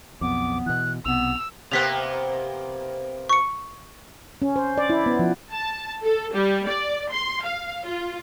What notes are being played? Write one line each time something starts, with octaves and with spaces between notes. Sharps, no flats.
B1 F2 B3 D6
B2 E3 F#6
B1 C3 B3 E6 F7
C3 A#3 B3 F#6 B6 F7
C#6 C#7
C#4
C5
D5
E4
B3
F3
A5
A4
G3
D5
C6
F5
F4